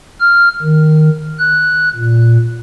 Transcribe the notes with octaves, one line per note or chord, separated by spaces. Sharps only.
F6
D#3
F#6
A#2